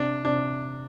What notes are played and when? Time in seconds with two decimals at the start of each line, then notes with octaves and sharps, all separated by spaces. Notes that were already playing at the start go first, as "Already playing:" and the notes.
Already playing: C3 D4
0.25 C3 D4